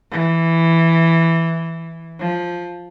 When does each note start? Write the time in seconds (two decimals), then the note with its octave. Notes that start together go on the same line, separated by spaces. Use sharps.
0.11 E3
2.20 F3